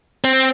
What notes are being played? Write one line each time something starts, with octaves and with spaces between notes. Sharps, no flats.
C4